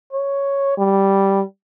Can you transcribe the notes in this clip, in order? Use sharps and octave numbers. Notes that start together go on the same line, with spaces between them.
C#5
G3